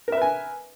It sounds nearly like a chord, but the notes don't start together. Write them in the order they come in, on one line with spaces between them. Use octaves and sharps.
A#4 E5 B4 G#5